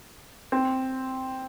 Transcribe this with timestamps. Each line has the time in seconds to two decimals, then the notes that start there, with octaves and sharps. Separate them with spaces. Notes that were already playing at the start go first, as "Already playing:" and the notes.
0.52 C4